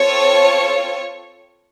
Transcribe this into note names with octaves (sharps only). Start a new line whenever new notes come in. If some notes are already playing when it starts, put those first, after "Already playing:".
Already playing: C4 F4 A4 C#5